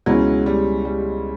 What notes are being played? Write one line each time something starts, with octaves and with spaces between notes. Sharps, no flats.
C#2 B2 F#3 G#3 C#4 E4
G3
G3